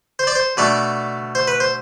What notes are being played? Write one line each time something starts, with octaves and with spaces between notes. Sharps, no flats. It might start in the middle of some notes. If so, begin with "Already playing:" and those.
C5
D5
C5
B2 A3 D4 D5
C5
B4
C5